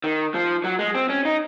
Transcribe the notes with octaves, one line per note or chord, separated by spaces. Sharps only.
D#3
F3
F#3
G#3
C4
C#4
D#4